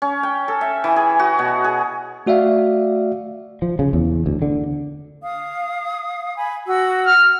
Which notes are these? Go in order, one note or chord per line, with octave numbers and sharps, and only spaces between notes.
C#4
G5
A4
E5
E3
G#4
F#4
B2
G#4
A3 F#4 D5 E5 F5
F3
C#3
E2
D2
D3
F5 D#6
G#5 B5
F#4 E6
F6